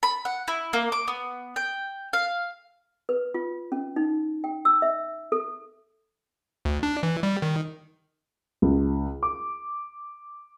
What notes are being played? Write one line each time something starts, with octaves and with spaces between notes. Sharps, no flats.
B5
F#5
E4
A#3
D6
B3
G5
F5
B4
F4
C#4
D#4
G5
E6
E5
A4
D2
D4
E3
G3
D#3
C#2
D6